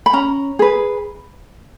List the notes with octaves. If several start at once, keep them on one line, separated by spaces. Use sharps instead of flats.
B5
C#4 A#5
G#4 B4